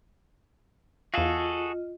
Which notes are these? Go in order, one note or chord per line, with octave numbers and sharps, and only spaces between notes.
E2 F4 F#4 G#4 A4 D#5 F5